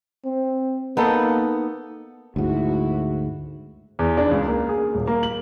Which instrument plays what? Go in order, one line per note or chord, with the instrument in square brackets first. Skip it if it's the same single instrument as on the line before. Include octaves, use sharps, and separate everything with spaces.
[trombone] C4
[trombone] A#3 [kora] B3 D#4 A4
[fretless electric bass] D2 G#2 [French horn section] E4 F#4
[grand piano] E2
D4
C#2
A#3
G#4
D#1
A#3
F#7